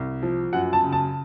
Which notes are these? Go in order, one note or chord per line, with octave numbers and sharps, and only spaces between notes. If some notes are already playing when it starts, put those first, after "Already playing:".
Already playing: C2
F3
F#2 F#5
A5
C#3
A5